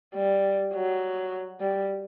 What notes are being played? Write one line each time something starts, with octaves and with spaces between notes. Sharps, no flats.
G3
F#3
G3